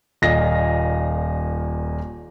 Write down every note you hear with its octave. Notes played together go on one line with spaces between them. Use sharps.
D#1 A#2 D#5 F5 A#6